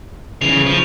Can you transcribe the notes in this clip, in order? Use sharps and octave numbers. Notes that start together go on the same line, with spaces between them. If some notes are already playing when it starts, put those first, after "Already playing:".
C#3 E3 F7
F3